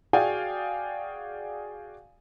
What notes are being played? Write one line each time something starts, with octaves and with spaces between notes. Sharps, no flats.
F#4 G#4 D5 F5 G5 G#5